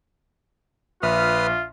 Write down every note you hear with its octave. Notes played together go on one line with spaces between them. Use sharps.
A#1 F4 B4 E5 D#6 F6